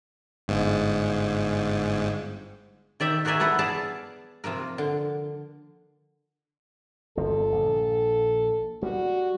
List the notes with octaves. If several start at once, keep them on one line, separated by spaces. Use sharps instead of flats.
G1 G#2
D#3 D5 E5 G5
F#4 G#4 A#4 D5 E5 G#5
B3 E4 A4 B4 F#5
G#4 D5 F5 A5
C3 F3 A#3 A#4
D3
G1 F3 A4
A#1
G3 F#4